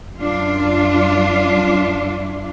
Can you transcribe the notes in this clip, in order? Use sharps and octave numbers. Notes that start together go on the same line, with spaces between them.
F#2 D4 F4